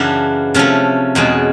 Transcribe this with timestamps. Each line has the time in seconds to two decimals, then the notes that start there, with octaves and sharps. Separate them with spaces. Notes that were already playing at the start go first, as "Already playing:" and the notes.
Already playing: F#2 C#3 E3 D4 F#4
0.54 C3 F3 A3 C#4
1.15 E2 B2 G#3 C#4